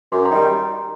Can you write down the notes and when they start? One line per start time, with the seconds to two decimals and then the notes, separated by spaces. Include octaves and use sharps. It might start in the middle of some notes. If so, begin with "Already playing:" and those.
0.12 F#2 C6 D6
0.25 A#5 C6
0.31 D#3 G3